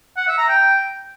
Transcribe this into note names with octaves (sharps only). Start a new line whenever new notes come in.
F#5
E5
A#5
G5